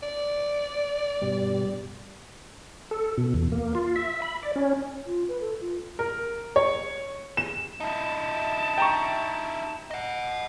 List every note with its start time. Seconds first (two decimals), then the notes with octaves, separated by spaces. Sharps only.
0.03 D5
1.22 G2 B2 G3
2.91 A4
3.18 B2
3.34 E2
3.52 A#3
3.75 F4
3.96 E5
4.22 B5
4.43 D5
4.56 C#4
5.07 F4
5.29 B4
5.41 A4
5.61 F4
5.99 A#4
6.56 C#5
7.37 E7
7.80 D#4 E4 A5
8.78 G5 A#5 C#6
9.91 D#5 F#5